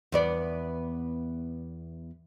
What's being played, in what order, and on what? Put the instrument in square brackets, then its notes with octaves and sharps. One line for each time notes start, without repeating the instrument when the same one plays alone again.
[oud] E2 B3 D5